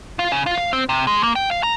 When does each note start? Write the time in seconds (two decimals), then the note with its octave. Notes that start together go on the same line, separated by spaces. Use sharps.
0.19 F4
0.32 C#3
0.46 F4
0.58 F5
0.73 C4
0.89 C3
1.07 G#3
1.23 A#3
1.35 G5
1.51 F5
1.63 A#5